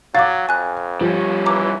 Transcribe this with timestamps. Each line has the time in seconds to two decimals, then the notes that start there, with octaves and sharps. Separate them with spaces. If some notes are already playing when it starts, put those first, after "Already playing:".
0.15 F#3 F5 D6 A6
0.49 F2 G#5 F#6
1.01 F3 G3 C#4
1.46 E3 A#5 D6